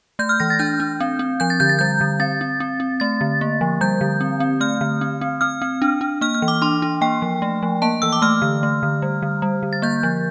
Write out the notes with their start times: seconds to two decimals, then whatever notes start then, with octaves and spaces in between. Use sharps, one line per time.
0.19 A3 G6
0.29 F6
0.40 E3 A#6
0.50 A6
0.59 D4 G6
0.80 D4
1.00 C4
1.19 C4
1.40 F3 G6
1.50 A6
1.60 D3 G6
1.69 A6
1.79 G3 G6
2.01 D3
2.20 C4 A6
2.41 C4
2.60 C4
2.80 C4
3.00 A3 A6
3.21 D3
3.41 A#3
3.61 F3
3.81 G3 G6
4.01 D3
4.21 C4
4.40 C4
4.61 A3 F6
4.81 D3
5.01 C4
5.21 C4
5.41 C4 F6
5.62 C4
5.82 D4
6.01 D4
6.21 A#3 F6
6.35 F6
6.42 E3
6.48 D6
6.62 D4 C6
6.82 D4
7.01 A#3 G5
7.22 F3
7.42 A3
7.63 F3
7.82 A#3 A5
8.02 E3 E6
8.12 D6
8.22 A3 F6
8.42 D3
8.63 A3
8.83 D3
9.02 G3
9.22 D3
9.42 G3
9.63 D3
9.73 A6
9.82 A#3 G6
10.03 F3